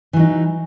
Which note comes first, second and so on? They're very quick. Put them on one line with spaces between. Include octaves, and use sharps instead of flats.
E3 F#3 D#4